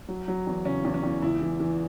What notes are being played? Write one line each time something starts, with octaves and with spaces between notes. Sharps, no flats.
F#3
F#3
E2
C#3 C#4
E2
C#4
E2
C#2 E4
E3
E3